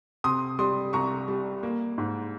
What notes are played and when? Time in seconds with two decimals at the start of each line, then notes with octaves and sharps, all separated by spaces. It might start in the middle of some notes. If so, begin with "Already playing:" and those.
0.24 C3 C6 D#6
0.59 G3 C6 D#6
0.93 C2 A#5 C#6
1.28 G3
1.63 A#3
1.98 G#2